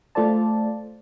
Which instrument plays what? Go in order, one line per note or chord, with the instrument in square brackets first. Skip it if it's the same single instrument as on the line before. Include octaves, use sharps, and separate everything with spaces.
[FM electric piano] A3 F4 A4 C5 D5 A5